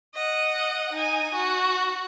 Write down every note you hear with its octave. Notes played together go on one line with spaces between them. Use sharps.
D#5 F#5
D#4 G#5
F#4